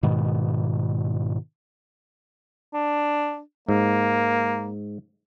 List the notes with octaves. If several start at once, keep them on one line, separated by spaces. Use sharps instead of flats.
G#2 B2 D#3
D4
G#2 A#3